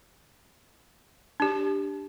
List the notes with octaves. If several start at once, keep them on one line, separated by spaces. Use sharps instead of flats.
D4 G4